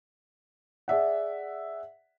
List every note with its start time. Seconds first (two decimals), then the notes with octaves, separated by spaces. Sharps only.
0.88 G#4 D5 E5 F#5